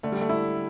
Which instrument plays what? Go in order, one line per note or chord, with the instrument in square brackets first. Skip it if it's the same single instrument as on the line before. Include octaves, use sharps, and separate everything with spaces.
[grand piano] D3 [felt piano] A3
[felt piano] G3
A3
[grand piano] E4